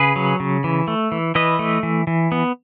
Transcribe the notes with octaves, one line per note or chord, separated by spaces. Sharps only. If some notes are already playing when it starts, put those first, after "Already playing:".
Already playing: C#3 G#4 B4
F#3
C#3
E3
A3
E3
E3 B4 D#5
A3
E3
E3
B3